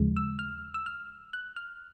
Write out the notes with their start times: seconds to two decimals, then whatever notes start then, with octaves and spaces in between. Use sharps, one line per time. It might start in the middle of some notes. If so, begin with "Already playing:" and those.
Already playing: D#2 C#3 F3 G#3
0.16 E6
0.39 F6
0.74 E6
0.86 F6
1.33 F#6
1.56 F6